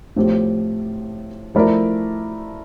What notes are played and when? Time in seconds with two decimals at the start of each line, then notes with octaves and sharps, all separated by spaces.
0.16 A2 F3 A3 C4 G4
1.55 F3 A3 E4 A#4 D5